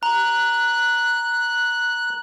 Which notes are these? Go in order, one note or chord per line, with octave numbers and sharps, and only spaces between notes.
A#5 F#6